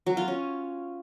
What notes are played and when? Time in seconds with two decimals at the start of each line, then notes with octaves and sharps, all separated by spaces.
0.06 F#3
0.17 F4
0.28 C#4